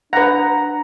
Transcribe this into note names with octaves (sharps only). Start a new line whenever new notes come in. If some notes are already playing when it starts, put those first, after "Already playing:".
D4 B4 F#5 A#5